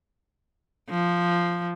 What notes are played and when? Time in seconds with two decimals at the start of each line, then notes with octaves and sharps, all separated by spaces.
0.90 F3